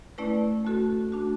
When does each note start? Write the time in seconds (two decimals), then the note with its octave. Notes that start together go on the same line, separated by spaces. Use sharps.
0.18 A3 C#4 E4 B4 D5
0.65 A3 C#4 F#4 A4
1.12 A3 D4 F#4